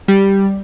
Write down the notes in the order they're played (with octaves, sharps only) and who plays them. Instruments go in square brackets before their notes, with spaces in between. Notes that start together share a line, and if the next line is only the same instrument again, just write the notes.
[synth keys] G3